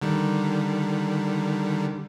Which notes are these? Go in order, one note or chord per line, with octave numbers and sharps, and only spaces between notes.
D3 D#3 G3